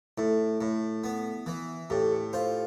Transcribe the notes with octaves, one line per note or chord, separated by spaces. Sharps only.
A2 E4
A2
B3
E3
A2 G4
A4
F4 C5